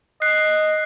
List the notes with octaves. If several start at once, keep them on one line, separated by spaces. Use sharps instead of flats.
D#5 F#6 C7